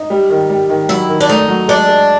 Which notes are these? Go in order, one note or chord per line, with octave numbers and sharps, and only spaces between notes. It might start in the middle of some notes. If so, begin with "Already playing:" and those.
Already playing: D#4
G3
D#3
G3
D#3
F#3 E4
D#3
D4
A3 D#4
F#3
G#3 D4
G#3